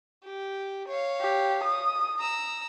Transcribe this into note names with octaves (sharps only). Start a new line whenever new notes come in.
G4
C#5 F5
G4
D#6
A#5 E6